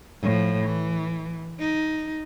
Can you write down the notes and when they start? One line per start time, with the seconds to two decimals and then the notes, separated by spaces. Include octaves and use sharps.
0.22 A2 F3
0.64 E3
1.60 D#4